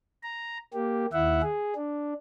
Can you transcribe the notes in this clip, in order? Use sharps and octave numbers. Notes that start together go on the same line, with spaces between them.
A#5
A#3 G4
D#2 E4 E5 F#5
G#4
D4